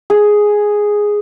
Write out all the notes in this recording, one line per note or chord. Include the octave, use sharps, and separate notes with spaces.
G#4